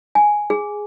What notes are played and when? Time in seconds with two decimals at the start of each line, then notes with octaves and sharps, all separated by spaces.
0.15 G#5
0.50 G#4